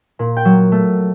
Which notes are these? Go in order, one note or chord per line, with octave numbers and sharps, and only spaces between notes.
A#2
G5
F#3
A3